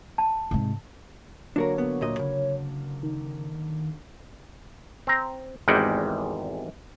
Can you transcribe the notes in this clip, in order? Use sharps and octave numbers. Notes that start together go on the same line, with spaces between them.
A5
G#2 C3
D3 F#3 A#3 D4 F#4 A#4 C#5
B3
D2 A#2 D#5
C#3
D#3
C4 A#5
G#1 E2 G3 G#3 F#5 G5